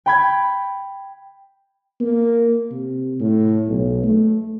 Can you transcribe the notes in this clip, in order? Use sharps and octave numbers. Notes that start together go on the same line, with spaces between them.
G5 B5 G#6
A#3
C3
A2
B1
A3